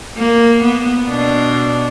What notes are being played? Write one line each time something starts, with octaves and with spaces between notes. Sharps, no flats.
A#3
B3
B2 D4